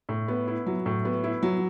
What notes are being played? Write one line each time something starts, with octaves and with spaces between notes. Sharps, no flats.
A2
B3
E4
F#3
A2
B3
E4
F#3